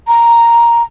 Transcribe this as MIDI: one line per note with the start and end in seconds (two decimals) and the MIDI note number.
0.07 0.83 82